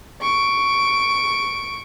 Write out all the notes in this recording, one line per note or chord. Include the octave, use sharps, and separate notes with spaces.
C#6 D7